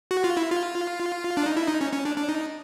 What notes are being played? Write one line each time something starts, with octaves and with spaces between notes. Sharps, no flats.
F#4
F4
E4
F4
D4
D#4
E4
D#4
C#4
C#4
D4
D4
D#4